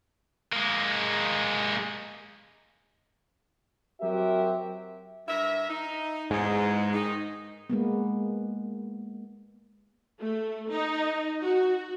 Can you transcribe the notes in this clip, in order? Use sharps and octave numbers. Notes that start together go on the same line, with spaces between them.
G#3 A#3
F#3 C4 F#4 G4 A#4 E5
G2 A#4 E5
D#4
E2 G#2 G#3
D#3 D#4
G#3 A#3 B3
A3
D#4
F#4